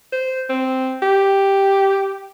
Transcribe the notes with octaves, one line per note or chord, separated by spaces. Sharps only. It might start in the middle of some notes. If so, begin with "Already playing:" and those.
C5
C4
G4